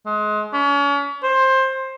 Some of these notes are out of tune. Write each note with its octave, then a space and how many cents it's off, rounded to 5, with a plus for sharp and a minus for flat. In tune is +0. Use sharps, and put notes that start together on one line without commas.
G#3 +30
C#4 +40
C5 +15